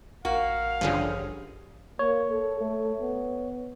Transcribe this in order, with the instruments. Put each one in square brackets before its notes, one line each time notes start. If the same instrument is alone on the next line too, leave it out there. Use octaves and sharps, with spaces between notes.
[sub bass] A1 [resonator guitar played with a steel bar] A#3 F#4 [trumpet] F5
[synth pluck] G2 D3 F3 [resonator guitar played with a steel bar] C#4 G#4
[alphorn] A#3 [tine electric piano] C#5
[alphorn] A4
A3
B3